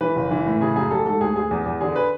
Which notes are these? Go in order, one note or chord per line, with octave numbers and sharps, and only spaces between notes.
E3 B4
F#1
E3
A2
C#3 G#4
F#2 G#4
A1 A4
G#2 A4
D2 G#4
D2 G#4
E2
E2
D3 G#4
B4